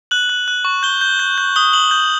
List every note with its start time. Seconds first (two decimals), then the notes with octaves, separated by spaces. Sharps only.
0.11 F#6 F#7
0.29 F#6
0.48 F#6
0.65 C#6
0.83 G6 G7
1.01 G6
1.20 G6
1.38 G6
1.56 D#6 G7
1.73 D#6 F#7
1.91 G6